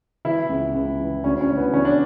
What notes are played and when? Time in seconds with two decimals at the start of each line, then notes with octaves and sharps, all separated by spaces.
0.25 E3 E4
0.49 C#2
0.74 C#2
0.99 E3
1.24 D2 C#4
1.41 C#4
1.49 D2
1.57 B3
1.73 E3 C#4
1.85 D4